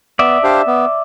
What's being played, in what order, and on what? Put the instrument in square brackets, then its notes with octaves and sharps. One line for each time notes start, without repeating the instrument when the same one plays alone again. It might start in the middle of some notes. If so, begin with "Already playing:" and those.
[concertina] B3 [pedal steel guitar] D5 E5
[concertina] D4 G4 C5 F5
B3